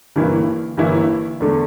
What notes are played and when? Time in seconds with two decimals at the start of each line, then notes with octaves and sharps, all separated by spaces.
0.16 G1 G2 E3 A#3 E4
0.77 G1 G2 E3 A#3 E4
1.40 E2 D3 A3